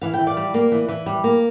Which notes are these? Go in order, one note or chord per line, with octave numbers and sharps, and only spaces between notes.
E3 F5
G5
E3
D5 F5
G3
A#3
E3
E3
G3
A#3